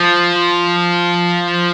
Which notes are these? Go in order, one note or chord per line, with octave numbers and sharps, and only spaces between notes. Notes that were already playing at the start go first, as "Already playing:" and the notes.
Already playing: F3